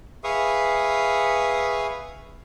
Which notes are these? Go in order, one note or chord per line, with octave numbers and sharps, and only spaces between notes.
G#4 B4 E5 F5 C#6 D#6